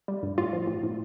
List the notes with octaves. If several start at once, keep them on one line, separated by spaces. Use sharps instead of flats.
G3
G2
A2 F4
F3
A2
A2